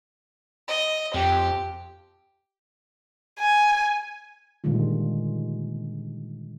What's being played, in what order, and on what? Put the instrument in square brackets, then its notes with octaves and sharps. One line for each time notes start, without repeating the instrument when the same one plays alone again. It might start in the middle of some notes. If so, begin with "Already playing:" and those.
[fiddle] D#5
[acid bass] F2 [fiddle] G4
[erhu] G#5
[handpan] A#2 D3 D#3 G3 G#3 F4